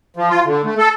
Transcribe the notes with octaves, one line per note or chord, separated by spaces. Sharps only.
F3
F4
D3
A3
A4